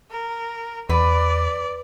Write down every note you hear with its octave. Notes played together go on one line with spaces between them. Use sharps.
A#4
E2 B4 D5